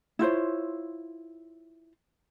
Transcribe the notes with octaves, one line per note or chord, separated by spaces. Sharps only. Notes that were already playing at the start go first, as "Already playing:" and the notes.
E4 F4 C5 C#5